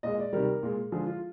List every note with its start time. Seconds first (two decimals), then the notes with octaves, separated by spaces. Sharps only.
0.03 A#2 G#3 D#5
0.19 D5
0.33 C3 D#3 G3 A#4
0.63 A#2 G#3
0.92 D3 F3 G#3 G#4
1.06 F4